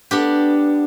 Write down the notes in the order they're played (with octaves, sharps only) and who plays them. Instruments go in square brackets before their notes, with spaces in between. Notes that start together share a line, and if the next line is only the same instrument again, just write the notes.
[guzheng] B3 D4 G4